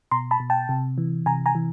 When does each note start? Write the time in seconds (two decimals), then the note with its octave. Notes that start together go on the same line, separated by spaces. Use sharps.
0.11 B2 A#5 C6
0.31 A5 B5
0.40 B2
0.50 G5 A5
0.69 C3
0.98 E3
1.26 C3 G#5 A#5
1.46 G#5 A#5
1.55 E3